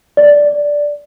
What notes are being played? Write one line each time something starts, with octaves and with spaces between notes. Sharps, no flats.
D5